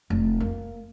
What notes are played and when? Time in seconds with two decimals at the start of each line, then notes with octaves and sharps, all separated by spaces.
0.10 F1
0.40 A#3